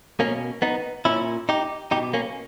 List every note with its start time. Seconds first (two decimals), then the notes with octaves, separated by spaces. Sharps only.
0.19 B2 A#3 C#4
0.62 B3 D#4
1.05 A#2 C#4 E4
1.49 D#4 G4
1.91 B2 D#4 G4
2.14 A#3 C#4